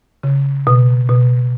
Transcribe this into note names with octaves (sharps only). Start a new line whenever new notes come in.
C#3
B2
B2